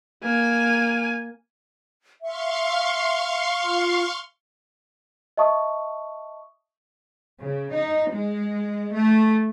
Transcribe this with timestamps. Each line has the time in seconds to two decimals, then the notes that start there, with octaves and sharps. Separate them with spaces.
0.23 A#3 G#5
2.22 E5 F5 C6 C#6
3.62 F4
5.37 D#5 E5 A5 C#6 D#6
7.42 C#3
7.75 D#4
8.10 G#3
8.96 A3